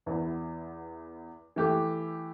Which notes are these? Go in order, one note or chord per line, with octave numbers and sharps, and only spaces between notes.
E2 E3 B3 E4
E3 A3 G4